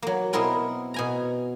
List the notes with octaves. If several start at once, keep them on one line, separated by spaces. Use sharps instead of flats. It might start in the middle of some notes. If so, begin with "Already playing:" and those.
F#3 A#3
B2 B3 C4 E4 A#4 G#5
B2 G#5 A#5